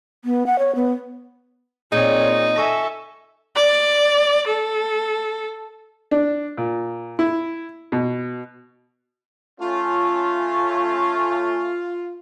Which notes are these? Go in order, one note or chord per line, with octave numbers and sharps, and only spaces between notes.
B3
F#5
C#5
B3
A#2 C4 D#4 G#4 C#5
A4 E5 G#5 C#6 A#6
D5
A4
D4
A#2
E4
B2
A3 C#4 F4